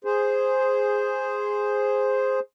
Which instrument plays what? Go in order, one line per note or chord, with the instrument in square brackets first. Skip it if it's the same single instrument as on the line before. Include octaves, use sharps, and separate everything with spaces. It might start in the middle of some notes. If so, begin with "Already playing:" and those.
[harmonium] G#4 C5